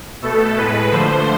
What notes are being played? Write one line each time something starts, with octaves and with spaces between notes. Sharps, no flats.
B2 A3 A4
A2 G#3 B4
D3 F3 A3 C5